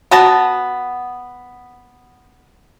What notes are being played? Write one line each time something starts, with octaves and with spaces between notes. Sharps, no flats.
B3 F#4 A5